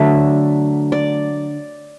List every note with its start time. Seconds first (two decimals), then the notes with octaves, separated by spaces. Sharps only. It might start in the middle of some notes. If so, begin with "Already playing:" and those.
Already playing: D3 F#3 A3 D5 E5
0.92 D5